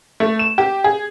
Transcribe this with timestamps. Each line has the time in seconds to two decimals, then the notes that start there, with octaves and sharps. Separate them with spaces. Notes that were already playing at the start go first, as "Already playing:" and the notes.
0.20 A3
0.39 E7
0.58 G4
0.84 G#4